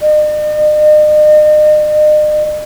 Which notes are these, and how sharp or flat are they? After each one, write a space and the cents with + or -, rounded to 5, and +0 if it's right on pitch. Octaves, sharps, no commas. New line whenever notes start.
D#5 -45